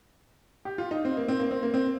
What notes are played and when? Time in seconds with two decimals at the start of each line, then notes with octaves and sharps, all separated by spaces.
0.65 G4
0.78 F4
0.91 D#4
1.05 C4
1.17 A#3
1.28 C4
1.40 A#3
1.51 C4
1.63 A#3
1.74 C4